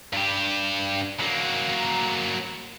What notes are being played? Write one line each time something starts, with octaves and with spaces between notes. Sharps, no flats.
G2 G4
F#3 A#3